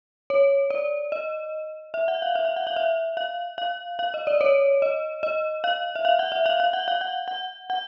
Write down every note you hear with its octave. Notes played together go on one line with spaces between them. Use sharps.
C#5
D5
D#5
E5
F#5
F5
E5
F5
F#5
F5
E5
F5
F5
F5
D#5
D5
C#5
D#5
D#5
F5
E5
F5
F#5
E5
F5
F5
F#5
F5
F#5
F#5
F#5